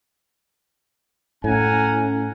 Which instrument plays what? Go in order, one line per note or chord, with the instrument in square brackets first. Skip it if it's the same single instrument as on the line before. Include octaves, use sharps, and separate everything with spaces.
[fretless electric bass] A2 [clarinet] C#4 [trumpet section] F#5 G#5 A#5